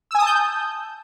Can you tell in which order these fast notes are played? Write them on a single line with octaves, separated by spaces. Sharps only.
E6 G#5 D#6 A5 G6